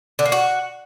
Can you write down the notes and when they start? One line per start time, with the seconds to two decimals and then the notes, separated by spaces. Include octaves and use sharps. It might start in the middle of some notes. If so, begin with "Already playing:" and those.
0.19 D3
0.25 A#3
0.32 F#4